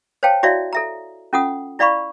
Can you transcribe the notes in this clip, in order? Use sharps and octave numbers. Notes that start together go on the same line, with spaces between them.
C5 C#5 F5 G5 A5
E4 F#4 C#5 D5 E5 F5
A4 E5 A#5
C#4 F4 A4 F#5 D#6
E4 D5 F5 B5 C#6